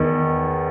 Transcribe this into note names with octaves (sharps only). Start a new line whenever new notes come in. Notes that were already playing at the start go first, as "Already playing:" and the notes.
Already playing: E2 D#3